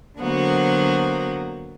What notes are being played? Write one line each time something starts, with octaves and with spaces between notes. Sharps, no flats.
D3 F#3 A#3 B3 F#4 C5